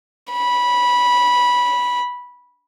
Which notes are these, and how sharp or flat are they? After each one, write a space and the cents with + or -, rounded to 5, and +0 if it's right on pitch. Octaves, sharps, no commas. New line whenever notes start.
B5 -15